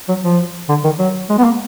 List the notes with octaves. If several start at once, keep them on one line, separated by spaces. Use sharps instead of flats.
F#3
F3
D3
D#3
F#3
G#3
B3
A#3